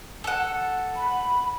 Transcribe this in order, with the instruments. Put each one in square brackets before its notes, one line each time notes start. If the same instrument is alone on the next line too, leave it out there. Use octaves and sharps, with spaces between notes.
[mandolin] A4 F#5
[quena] B5